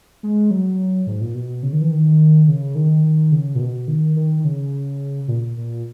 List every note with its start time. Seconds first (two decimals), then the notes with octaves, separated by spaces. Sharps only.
0.23 G#3
0.51 F#3
1.07 G#2
1.21 A#2
1.34 B2
1.63 C#3
1.73 D#3
1.81 E3
1.91 D#3
2.48 C#3
2.75 D#3
3.04 D#3
3.32 C#3
3.55 A#2
3.60 B2
3.88 D#3
4.16 D#3
4.39 D#3
4.44 C#3
5.28 A#2
5.57 A#2